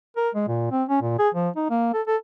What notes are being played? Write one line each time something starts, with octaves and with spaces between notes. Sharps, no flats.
A#4
G#3
A#2
C4
C#4
A#2
G#4
F3
D#4
A#3
A4
A4